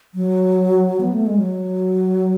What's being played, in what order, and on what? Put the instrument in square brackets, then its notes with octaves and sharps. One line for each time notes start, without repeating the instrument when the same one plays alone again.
[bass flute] F#3
B3
A3
G#3
F#3